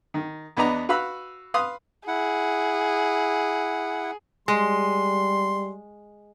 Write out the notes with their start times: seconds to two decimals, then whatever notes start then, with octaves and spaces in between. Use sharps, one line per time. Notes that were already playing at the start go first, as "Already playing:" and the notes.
0.14 D#3
0.57 E2 B3 D4 B4 D#5 A#5
0.89 F#4 B4 F5 B5 E6
1.54 B4 F5 C6 D#6
2.07 E4 G#4 F#5
4.48 G3 G#3 C6